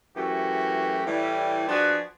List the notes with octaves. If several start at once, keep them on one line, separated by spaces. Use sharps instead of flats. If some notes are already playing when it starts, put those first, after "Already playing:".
F#2 E3 A3 F#4 G4
A2 E3 G3
F3 D4 F#4 G#4 B4